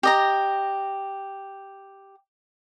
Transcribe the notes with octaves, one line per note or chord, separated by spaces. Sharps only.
G4 D#5 A#5